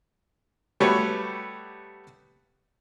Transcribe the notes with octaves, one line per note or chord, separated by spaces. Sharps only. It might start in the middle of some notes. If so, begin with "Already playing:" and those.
G3 A3 B3 F#4 C#5